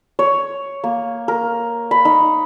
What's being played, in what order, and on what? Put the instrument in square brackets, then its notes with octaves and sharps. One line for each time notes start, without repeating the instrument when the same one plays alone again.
[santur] C#5
A#3
A#4
B5
D#4